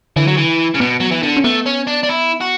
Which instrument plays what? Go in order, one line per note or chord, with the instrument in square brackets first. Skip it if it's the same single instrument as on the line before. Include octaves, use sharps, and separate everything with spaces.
[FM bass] D3 [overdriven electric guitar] E3
[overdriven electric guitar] F#3
E3
C#3
[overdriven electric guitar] B2 [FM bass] B3
[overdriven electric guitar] F#3
E3
D3
[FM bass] C#4
[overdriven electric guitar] A3 [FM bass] B3
[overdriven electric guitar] C#4
D4
D4
E4
F#4